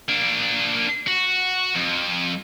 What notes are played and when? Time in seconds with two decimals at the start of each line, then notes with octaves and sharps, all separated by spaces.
0.08 A#3 D4
1.07 F#4
1.75 F2